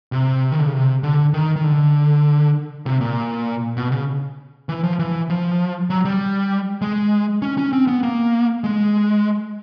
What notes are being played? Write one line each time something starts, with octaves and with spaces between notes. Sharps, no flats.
C3
D#3
D3
C#3
C3
D3
D#3
D#3
D3
C3
A#2
B2
C#3
E3
F3
E3
F3
F#3
G3
G#3
C#4
C#4
C4
B3
A#3
G#3